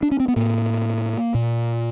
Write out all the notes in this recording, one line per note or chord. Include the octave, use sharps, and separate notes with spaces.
D4
C#4
C4
B3
A2 A#3
A#2